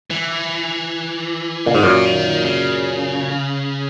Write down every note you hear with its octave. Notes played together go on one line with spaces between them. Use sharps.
E3
A#2 C#3
G#2 D#3
F#2 A#2 C#3
D#3
C#3